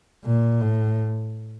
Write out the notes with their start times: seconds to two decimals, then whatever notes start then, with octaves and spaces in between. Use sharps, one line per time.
0.25 A#2
0.61 A2